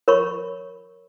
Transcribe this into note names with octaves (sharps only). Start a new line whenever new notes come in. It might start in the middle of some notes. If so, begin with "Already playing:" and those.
A#4 C#5 B5 C#6